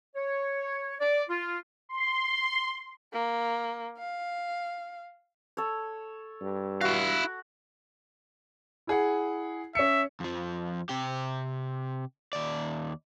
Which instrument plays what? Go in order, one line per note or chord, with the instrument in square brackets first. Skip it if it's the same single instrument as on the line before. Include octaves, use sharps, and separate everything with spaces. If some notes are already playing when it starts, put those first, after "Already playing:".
[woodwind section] C#5
D5
F4
[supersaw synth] C6
[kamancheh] A#3
F5
[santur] A4 C#5
[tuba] G2
[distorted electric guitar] E4 F5 [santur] F#4
[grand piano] E4 G#4 F#5
[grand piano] C#4 C#7 [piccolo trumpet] E5
[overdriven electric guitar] F2 F3
C3 G4
D#2 D5